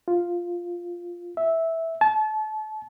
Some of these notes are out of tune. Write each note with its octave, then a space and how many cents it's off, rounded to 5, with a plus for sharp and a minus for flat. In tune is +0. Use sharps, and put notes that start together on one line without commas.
F4 +0
E5 -10
A5 -30